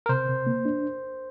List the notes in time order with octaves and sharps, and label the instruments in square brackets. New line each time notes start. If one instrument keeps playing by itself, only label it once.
[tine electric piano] A#4
[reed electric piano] C3 [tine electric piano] C5
[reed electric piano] C3
A#3
D4